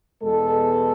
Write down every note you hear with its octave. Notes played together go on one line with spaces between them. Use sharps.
E2 B2 G#3 B3 A4